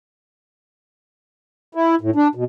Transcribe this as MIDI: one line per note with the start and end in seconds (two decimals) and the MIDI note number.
1.75 1.95 64
2.01 2.10 45
2.15 2.28 62
2.35 2.44 47